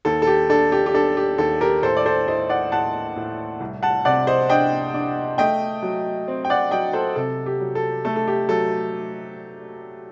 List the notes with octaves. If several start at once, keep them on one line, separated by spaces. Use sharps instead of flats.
D#2 A4
A4
G4
D4 A4
G4
G4
D4 A4
G4
D#2 A4
G4 A#4
A2 A4 C5
D5
A4 C5
A2 C5 D#5
D5 F#5
A2 F#5 A5
A2
C2
F#5 A5
C3 D5 F#5
C5 D#5
D4 D#5 G5
D4
A3 D#5 G5
F#3
C4
G5
D5 F#5
F#3 D#5 G5
A4 C5
C3 A4
G4
F#3
A4
A3 A4
A4
G4
F#3 A4